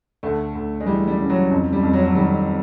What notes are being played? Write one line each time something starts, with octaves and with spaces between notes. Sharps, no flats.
D2 A3
D2
G#3
E3 G3
G3
C#3
F#3
F2
G3
F2
F#3
F#3
D#3 G3